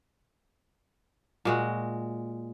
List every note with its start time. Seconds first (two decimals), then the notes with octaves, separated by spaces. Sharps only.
1.45 A#2 G#3 F#4